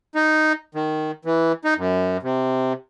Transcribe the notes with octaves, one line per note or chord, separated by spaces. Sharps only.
D#4
D#3
E3
D#4
F#2
C3